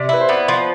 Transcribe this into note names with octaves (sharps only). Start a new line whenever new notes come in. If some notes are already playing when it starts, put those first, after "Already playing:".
Already playing: C3 D5
E4 B4
C5
B3 D5
F3 C5